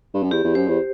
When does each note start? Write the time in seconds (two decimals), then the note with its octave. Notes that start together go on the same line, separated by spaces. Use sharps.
0.14 G2
0.23 F#2
0.31 E2 G4
0.44 E2
0.55 F#2 C5
0.68 E2